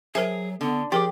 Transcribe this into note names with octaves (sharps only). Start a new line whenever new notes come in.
F#3 G#4 A#4 C5 E5
D3 B3
F3 G4 G#4 A#4 D6